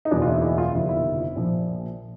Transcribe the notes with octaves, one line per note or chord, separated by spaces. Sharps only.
D#4
F#1 E2 B2 D4
F4
E4
E4
F4
G1 F2 C3 D#3 E4
E4
A#1 A#2 F3